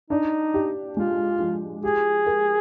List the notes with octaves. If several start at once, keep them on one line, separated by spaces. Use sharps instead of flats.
D4 D#4
G4
G#3 F4
F3
G4 G#4
A#4